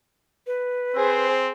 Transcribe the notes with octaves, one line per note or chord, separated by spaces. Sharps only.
B4
C4 G#4 C5